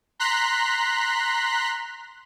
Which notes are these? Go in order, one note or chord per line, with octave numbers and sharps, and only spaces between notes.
A#5 C6 F#6 B6